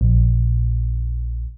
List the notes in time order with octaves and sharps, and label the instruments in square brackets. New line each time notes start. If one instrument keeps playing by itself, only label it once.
[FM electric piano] A#1